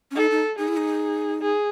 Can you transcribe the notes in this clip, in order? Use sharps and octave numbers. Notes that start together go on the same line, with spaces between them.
C#4
D#4 A4
D#4
D#4 G#4
E4
D#4
G#4